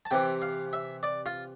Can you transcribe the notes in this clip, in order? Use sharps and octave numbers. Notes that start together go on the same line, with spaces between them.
A5
C3 E3 G5
F5
E5
D5
F4